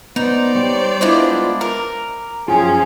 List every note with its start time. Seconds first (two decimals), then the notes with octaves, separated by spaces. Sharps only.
0.16 B3 D#4 C5 D5
0.55 G3 C#5 G5
1.01 G#3 B3 D4 E4 F4 D#5
1.61 A#4 A#5 D6 F6
2.48 F#2 F3 C#4 F4 G#4 G5